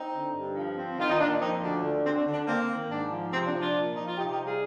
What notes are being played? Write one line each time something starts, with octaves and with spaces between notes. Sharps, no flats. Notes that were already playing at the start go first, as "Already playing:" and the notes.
Already playing: C4 D#4
D3
G2
F3
C4
D#3 F4
D#4
A#2 D4
F3 C4 D#4
D2 D4
D3
D2 C4
D4
D3
D4
A#3 C4
D#3
G#2 D4
F3
C3 C4
D4
F3
D4 F4
A#2
F3 D#4
F4
C3 D#4 G4
D#4 G4
G3
F4 G#4